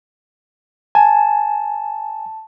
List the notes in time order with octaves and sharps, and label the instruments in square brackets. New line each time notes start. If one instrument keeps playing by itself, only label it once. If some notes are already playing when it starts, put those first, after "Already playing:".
[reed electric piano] G#5 [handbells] A5